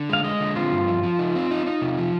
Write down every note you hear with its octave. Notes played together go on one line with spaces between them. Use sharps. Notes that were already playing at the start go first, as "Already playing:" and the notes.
Already playing: D3
G#3 F5
G#3 D#5
D3
C4 F4
G2
F3
F3
D#4
C4
D#4
D#4
C3
F3